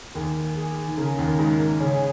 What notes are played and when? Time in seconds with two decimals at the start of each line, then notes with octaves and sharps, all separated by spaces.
0.15 D#2 D#3 G#4
0.57 G#4
0.87 D#3
0.97 C#3 A#4
1.18 D#2 D#3
1.39 G#2 G#3
1.80 C#3 C#4 G#4